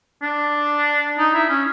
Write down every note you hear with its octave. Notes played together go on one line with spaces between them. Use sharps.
D4
D#4
E4
C#4